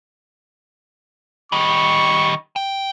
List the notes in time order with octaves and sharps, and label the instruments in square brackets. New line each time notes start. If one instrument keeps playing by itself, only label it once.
[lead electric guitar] D#3 G3 [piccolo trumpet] C#6
[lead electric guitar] G5